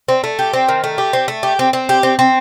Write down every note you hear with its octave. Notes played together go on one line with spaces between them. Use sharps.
C4
A3
G4
C4
D#3
A3
G4
C4
A3
G4
C4
C4
G4
C4
C4